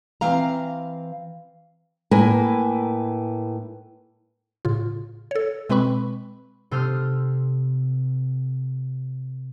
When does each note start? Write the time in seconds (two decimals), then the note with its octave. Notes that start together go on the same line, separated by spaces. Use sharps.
0.21 E3 C4 F5 A#5
2.11 A2 A#3 B4 G#5
4.65 A2 C#3 F4
5.31 A4 C#5
5.70 B2 G#3 C4 B4 B5 C#6
6.71 C3 A4 C5 D#6 F6 G6